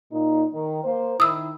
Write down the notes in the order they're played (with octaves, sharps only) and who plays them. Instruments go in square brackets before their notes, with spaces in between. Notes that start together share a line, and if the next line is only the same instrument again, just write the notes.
[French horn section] A#2 D#4
D#3
A#3 C5
[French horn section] D#3 E4 [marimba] D#6 E6